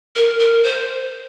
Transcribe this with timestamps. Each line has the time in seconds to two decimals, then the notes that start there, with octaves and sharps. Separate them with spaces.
0.16 A#4
0.39 A#4
0.63 C5